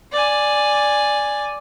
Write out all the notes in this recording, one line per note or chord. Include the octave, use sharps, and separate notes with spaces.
D5 G#5